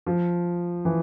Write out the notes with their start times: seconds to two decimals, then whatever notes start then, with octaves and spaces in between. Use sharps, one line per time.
0.07 F3
0.85 E3